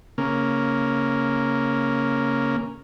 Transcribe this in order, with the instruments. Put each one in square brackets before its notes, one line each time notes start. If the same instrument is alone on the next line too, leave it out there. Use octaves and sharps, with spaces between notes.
[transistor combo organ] C#3 A#3